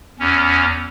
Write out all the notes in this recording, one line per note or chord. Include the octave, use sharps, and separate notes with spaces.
E2 C#4